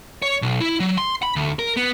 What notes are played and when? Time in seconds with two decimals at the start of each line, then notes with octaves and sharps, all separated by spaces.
0.22 C#5
0.42 B1
0.60 E4
0.80 F#3
0.98 C6
1.23 B5
1.36 D2
1.59 A#4
1.77 B3